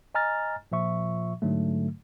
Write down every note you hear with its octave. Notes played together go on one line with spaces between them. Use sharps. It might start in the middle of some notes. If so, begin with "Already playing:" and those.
D#5 G#5 A#5 F6 A6
A#2 F3 E5 C#6
G#2 D3 F#3 A3